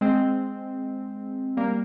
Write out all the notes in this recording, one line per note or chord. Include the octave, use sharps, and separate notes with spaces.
G#3 C4
G3 A#3